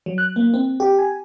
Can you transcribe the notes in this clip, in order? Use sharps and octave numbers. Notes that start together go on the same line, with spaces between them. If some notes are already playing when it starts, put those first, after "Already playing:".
F#3
F#6
A#3
C4
G4
G#5